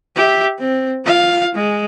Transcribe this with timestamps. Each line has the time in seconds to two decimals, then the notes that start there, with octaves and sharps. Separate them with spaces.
0.16 G4 E5
0.60 C4
1.06 F4 F5
1.55 G#3